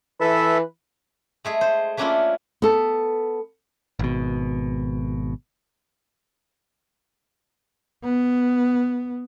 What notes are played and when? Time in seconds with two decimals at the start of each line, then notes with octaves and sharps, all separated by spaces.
0.20 E3 A4 B4 E5
1.45 G#3 A3 G#4
1.61 C5
1.97 A3 A#3 C#4 D4 E4 F4
2.62 B3 A4
3.99 G#1 B2
8.04 B3